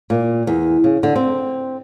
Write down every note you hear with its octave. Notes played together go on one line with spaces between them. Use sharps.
A#2
E2
C#3
D3
C4